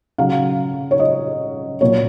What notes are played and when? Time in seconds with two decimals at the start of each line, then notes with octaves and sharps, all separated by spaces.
0.18 C#3 F#3 F5
0.91 C#5
1.00 D#5
1.81 A#2 F#3 C#5